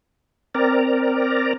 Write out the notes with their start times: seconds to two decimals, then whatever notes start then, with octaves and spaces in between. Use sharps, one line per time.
0.55 C4 A#4 D5 A#5